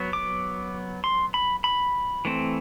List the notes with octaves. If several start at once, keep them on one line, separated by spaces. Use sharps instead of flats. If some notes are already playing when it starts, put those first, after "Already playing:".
Already playing: F#3 B3
D6
C6
B5
B5
E3 A3 C4